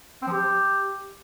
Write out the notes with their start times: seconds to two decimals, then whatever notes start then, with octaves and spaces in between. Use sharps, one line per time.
0.22 C4
0.27 F3
0.32 G4